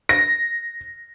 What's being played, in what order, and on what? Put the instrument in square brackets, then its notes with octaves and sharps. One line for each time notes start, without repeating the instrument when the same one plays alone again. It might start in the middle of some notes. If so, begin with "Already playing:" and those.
[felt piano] A#6